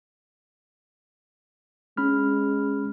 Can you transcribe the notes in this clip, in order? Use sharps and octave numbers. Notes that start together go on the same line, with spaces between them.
G#3 C#4 B5 F6